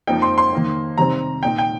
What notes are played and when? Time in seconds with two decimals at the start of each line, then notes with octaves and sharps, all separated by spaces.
0.07 F2 F3 A#3 D#4 G5
0.22 C6
0.38 C6
0.52 D#3 A#3 D#4
0.98 C3 D#3 G3 C4 A#5
1.43 A#2 A#3 D#4 G5
1.58 G5